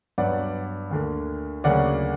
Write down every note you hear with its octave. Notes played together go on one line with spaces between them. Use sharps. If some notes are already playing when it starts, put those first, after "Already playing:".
G2 F#3 B3 D5 F#5
D2 D3 A#3
D2 C#3 F#3 A#3 D5 F#5